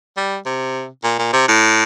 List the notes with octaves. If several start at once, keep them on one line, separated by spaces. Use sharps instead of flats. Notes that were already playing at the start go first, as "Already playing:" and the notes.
G3
C3
A#2
A#2
C3
A2